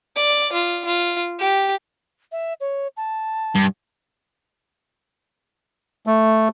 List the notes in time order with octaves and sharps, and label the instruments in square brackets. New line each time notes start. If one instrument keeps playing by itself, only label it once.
[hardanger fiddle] D5
F4
F4
G4
[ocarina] E5
C#5
A5
[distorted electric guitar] G2
[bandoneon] A3